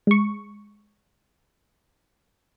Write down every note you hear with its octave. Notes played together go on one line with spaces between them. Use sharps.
G#3 C#6